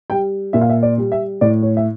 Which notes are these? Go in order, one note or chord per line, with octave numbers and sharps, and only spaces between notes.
G3 G5
A#2 E5
F5
E5
D5
G3
E5
A2 D5
C#5
E5